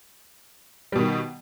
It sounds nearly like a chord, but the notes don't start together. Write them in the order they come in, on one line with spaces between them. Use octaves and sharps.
G3 B2 D#3